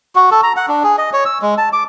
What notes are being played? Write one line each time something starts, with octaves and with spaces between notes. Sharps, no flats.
F#4
A4
A#5
F#5
D4
G#4
D#5
C#5
E6
G#3
A5
D6